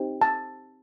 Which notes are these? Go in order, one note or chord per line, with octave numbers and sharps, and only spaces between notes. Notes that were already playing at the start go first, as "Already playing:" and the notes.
Already playing: C4 D#4 G4
A5